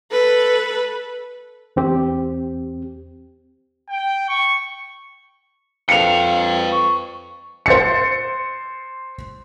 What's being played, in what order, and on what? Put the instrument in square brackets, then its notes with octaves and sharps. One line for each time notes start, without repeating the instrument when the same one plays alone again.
[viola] A4 B4
[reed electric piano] E2 C4 G4
[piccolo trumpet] G5
C#6
[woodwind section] F2 [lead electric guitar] B4 G5 [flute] F5 [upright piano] C#7 F7
[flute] C#6
[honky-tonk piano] C5 A6 C#7